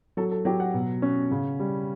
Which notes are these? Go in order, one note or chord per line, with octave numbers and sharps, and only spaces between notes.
F#3 A4
A4
F#3 G4
F#5
B2
C#4
C#3
G3